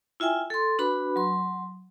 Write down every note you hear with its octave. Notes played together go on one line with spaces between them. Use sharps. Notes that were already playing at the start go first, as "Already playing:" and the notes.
E4 F4 E5 G5 G#5
A4 C6
D4 F#4 B4 B5
F#3 C6